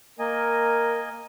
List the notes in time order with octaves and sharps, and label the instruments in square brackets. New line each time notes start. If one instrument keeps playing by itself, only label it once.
[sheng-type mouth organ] A#3 D#5 G#5 [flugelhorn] A#4